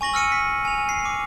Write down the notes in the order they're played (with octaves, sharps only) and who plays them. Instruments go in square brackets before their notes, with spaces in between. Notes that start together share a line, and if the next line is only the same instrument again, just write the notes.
[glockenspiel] G#5 C#6 A#6 F#7
E6 F6 C#7 D#7
B6
G#5 F7
C7
D6